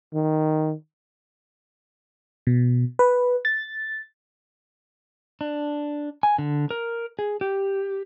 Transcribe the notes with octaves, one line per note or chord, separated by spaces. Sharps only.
D#3
B2
B4
A6
D4
G#5
D3
A#4
G#4
G4